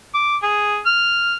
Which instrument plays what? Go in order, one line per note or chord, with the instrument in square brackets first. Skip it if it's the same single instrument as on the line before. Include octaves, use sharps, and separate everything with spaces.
[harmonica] D6
G#4
F6